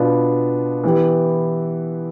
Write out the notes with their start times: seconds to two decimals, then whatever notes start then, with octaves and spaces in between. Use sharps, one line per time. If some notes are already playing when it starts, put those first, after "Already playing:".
Already playing: B2 B3 D4 F4
0.84 E3 B3 E4 G4